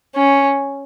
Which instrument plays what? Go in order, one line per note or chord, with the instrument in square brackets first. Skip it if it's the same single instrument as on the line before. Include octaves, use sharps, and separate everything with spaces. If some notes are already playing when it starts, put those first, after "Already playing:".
[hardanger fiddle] C#4